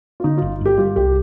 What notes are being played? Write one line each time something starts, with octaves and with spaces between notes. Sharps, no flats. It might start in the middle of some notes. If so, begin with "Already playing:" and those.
F4
D3 D#4
G1 F4
G2 G4
G3 F4
C2 G4